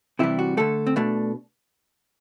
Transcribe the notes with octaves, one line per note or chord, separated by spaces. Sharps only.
C3 E3 G3 E4
F#4
D3 A3 A4
C4
B2 A3 D4